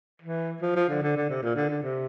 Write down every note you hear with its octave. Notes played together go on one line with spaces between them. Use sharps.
E3
F3
F3
D3
D3
D3
C3
A#2
D3
D3
C3